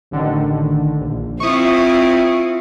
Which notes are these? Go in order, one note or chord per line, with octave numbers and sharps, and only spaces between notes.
A1 D3 D#3
A#1
C4 E4 F4 C#6 D#6